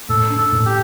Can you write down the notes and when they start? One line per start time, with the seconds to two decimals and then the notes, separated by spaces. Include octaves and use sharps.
0.09 A2 A4
0.30 D4
0.38 A4
0.52 A2
0.66 G4